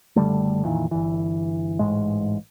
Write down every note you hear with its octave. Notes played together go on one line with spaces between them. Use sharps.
F#1 D3 G3 A3
F2 A#2 D#3 E3
G1 E3
A1 G#2 G#3